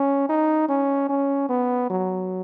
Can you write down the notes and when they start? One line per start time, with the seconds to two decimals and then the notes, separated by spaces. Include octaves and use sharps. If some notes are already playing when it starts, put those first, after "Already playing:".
Already playing: C#4
0.29 D#4
0.69 C#4
1.09 C#4
1.49 B3
1.90 F#3